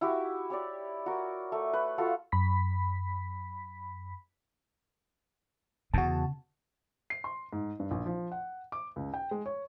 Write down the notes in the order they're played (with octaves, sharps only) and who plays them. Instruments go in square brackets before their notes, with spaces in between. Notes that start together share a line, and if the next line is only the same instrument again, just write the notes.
[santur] E4 F#4 G4
G4 C#5 D5
F#4 A#4
A3
B4
F4 F#4 A4 F5
[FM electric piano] F#2 B5 B6
[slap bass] E2 [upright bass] C#3 [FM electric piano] F#4 A5
[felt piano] C7
C6
G#2
G2
A#1
F3
F#5
D6
C#2
G5
G#3
C#5